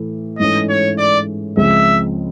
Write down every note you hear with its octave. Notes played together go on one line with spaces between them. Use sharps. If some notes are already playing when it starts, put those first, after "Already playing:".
Already playing: A2 E3 A3
G#2 E3 A3 C#4 D#5
C#5
D5
C#2 C#3 F3 G#3 C4 E5